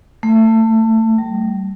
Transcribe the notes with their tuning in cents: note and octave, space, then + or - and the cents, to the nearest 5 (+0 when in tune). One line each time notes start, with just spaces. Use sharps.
A3 +25
G3 -20